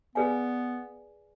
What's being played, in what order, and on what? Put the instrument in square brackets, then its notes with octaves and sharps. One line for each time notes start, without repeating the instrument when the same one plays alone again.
[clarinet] B3 [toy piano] G#4 B4 D5 F5 G#5